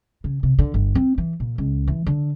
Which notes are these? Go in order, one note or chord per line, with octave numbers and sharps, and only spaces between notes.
C#3
C3
D3
G1
C4
E3
A#2
C#2
E3
D3